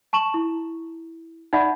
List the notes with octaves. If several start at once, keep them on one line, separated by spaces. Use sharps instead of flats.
A5 C#6 E7 F#7
E4
D#4 D5 E5 F#5 B5